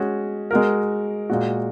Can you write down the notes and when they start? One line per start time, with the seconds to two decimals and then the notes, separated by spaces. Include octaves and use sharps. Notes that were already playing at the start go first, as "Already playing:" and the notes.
Already playing: G#3 C#4 F#4
0.51 G#3 F#4 A#4
1.30 A#2 G#3 F#4